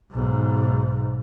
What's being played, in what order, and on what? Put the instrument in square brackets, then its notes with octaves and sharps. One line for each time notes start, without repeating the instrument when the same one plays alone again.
[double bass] B1 G#2